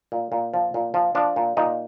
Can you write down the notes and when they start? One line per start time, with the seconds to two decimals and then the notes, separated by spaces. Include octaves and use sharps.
0.12 A#2
0.32 A#2
0.54 F3
0.74 A#2
0.94 F3
1.15 F3 D4
1.36 A#2
1.57 A#2 D#4